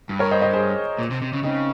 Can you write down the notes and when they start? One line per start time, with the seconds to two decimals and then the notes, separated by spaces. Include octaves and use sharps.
0.09 G2
0.19 A#4 C#5
0.31 C5 D#5
0.42 C5 D#5
0.53 G#4 C5
0.99 A#2
1.11 C3
1.22 C3
1.33 C#3
1.43 C#3 C4 D#4